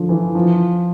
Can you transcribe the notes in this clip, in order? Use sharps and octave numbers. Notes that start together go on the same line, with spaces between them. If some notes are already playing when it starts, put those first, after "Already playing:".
Already playing: D3 F3
E3
F3